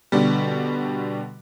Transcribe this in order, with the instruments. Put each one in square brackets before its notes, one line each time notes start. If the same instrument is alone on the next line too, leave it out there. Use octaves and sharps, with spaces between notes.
[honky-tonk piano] B2 D3 G3